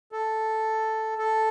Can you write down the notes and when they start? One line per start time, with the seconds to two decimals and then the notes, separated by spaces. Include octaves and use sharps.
0.12 A4
1.18 A4